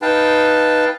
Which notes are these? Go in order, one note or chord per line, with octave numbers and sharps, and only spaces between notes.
D#4 B4 F5 G5 A5